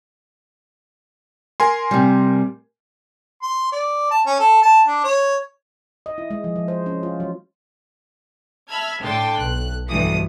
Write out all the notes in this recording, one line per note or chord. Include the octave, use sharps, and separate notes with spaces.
A#4 G#5 C6
C3 G3
C6
D5
A5
C#4
A4
A5
D4
C#5
D#5
E4
G#3
F3
F3
C5
C#4
F4
F#3
E5 A5 B5 F6 G#6
A2 D3 A4 G5 C6 A6
B1 F#6
G1 D2 G2 B2 E3 D#6